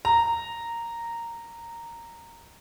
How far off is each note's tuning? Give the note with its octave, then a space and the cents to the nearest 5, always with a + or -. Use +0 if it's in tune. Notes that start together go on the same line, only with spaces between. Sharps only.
A#5 -10